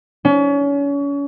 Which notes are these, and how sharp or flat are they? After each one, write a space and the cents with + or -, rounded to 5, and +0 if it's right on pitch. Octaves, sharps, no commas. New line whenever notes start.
C#4 +35